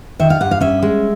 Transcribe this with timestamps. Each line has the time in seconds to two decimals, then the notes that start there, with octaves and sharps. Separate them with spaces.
0.20 D#3 E5
0.30 F5
0.41 G2 F#5
0.51 F5
0.61 C#4 E5
0.82 G#3